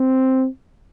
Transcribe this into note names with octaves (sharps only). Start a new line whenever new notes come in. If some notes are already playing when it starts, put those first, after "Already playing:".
Already playing: C4